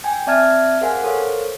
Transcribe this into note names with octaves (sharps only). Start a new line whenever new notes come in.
G5 G#5
C4 D5 E5 A5 F6 G#6
G#4 A#4 C5 F5 F#5 G#5
A4 A#4 C5 C#5 F5